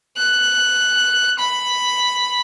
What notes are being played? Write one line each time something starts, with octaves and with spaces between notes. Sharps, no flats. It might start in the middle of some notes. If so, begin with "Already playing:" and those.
F#6
B5